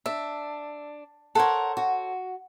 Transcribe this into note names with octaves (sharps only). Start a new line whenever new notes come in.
D4 E5
A4 A#4 C5 C#5 F#5
F#4